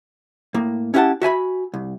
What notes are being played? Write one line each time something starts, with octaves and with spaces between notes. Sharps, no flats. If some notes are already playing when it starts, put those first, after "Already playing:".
A2 A#3
C#4 E4 G4 B4 F#5 A5
F#4 E5 G#5 B5
C2